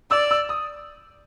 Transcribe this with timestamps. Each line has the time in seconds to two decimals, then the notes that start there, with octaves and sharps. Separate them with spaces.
0.11 D5 E6
0.31 E6
0.49 D#6